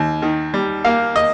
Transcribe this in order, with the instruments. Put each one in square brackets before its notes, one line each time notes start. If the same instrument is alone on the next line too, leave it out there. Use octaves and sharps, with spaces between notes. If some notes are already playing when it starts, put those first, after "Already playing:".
Already playing: [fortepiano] D#2
D#3
G3
A#3 F5
D#5